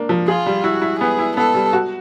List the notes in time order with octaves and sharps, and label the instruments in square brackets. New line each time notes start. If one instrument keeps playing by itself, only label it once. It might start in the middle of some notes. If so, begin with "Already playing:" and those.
Already playing: [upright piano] A#3 D4
F3
[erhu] F4 [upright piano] G#4
[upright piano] G3
[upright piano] E4 [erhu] F#4
[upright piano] E4
[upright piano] B3 [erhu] G#4
[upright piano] E4
[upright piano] B3 [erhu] A4
[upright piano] G3
F#4